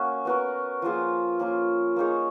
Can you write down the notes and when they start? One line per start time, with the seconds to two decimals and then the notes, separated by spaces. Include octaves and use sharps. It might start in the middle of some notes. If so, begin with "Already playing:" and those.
Already playing: A#3 C#4 F#4
0.25 B3 F#4 A#4
0.82 F3 A#3 F4 G#4
1.39 A#3 C#4 F4 A#4
1.96 A#3 D#4 G#4 C#5